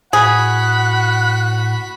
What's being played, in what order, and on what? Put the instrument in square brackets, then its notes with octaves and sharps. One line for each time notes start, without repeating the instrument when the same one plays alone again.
[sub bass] A2 [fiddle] F#4 B5 [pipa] G#4 [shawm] F#5